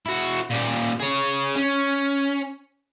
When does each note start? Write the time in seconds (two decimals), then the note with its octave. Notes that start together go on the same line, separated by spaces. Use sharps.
0.06 E4 F#4
0.51 A#2 G4
1.00 G#4 C#5
1.55 C#4